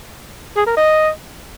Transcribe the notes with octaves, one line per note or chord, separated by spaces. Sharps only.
G#4
A#4
D#5